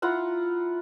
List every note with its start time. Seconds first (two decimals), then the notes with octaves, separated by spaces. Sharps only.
0.02 E4 F4 F#5 A#5